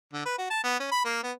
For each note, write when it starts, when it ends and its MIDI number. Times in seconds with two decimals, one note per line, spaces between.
0.13 0.25 50
0.25 0.36 71
0.38 0.46 66
0.50 0.63 81
0.64 0.79 59
0.80 0.90 61
0.92 1.03 83
1.05 1.21 58
1.23 1.32 59